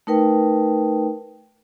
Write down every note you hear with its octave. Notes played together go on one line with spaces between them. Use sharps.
A3 D#4 A#4 B4 G5